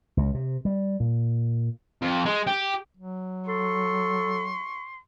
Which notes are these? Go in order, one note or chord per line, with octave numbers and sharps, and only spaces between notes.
C#2
C3
G3
A#2
F2
G#3
G4
F#3
A4 C6 C#6